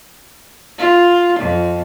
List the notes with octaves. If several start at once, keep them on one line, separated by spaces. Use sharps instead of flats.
F4
F2